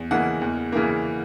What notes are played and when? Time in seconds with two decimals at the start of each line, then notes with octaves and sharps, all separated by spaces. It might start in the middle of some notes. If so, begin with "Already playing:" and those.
Already playing: E2
0.11 C#3 E3 A#3 F#5
0.42 E2
0.72 C#3 E3 A#3